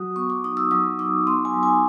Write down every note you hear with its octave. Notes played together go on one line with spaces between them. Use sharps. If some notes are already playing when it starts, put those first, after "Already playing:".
Already playing: F#3 F#4 D#6
B3 C#6
D6
D#4 D#6
E6
F#3 D#6
D#4 D6
B3 C6
G#5
F#3
G#5